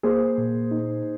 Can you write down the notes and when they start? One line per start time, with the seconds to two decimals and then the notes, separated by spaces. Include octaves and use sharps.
0.03 A#3 G#4 C5
0.38 A#2
0.71 D#4